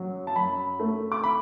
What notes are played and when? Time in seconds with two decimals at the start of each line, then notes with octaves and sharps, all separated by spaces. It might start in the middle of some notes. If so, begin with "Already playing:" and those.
Already playing: F#2 F#3
0.27 A5
0.36 F#2 B5
0.80 A3
1.12 D6
1.24 B5